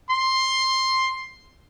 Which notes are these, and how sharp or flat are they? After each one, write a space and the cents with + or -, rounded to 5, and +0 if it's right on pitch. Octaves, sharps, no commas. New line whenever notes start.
C6 +10